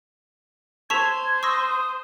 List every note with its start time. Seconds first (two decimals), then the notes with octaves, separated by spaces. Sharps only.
0.90 C5 A5 C#6 E6 G#6 B6 E7 F7
1.43 C#6 D#6 E6 A#6